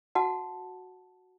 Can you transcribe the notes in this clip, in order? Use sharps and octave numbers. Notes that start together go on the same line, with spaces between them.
F#4 F#5 A5